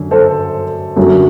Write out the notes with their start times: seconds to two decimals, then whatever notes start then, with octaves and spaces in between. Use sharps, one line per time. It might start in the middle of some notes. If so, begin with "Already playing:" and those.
Already playing: F#2 D3
0.11 A4 C5
0.96 F#2 D3 F#3 A3